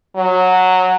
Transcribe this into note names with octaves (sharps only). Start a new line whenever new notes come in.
F#3